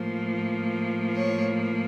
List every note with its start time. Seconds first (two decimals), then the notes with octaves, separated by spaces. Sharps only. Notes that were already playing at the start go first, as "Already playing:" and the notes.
Already playing: A2 F3 A#3
1.16 C#5